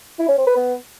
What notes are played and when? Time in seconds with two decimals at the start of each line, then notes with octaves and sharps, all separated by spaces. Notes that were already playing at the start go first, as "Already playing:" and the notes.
0.19 E4
0.29 C#4
0.38 C4
0.47 B4
0.56 B3